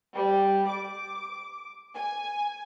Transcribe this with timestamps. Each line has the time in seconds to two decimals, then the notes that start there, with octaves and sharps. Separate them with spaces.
0.14 G3
0.67 D6
1.96 G#5